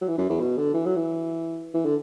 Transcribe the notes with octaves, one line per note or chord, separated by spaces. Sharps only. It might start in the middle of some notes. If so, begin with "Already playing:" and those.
F#3
E3
F#2
E2
B2
D3
E3
F#3
E3
E3
D3